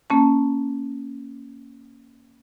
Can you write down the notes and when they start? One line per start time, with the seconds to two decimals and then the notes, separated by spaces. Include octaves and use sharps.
0.10 A#3 C#4 A5